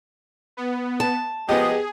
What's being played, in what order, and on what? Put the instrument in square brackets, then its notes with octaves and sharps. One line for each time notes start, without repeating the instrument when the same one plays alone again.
[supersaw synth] B3
[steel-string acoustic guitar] A5
[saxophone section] F3 G#3 D#5 [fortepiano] B3 G4 [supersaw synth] G#4